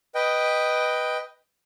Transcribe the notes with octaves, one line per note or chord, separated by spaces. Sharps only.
B4 D#5 G5